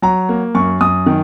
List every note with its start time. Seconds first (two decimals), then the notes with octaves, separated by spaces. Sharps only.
0.02 F#3 A#5
0.29 A#3
0.55 F#2 C#6
0.81 F#2 D#6
1.06 D#3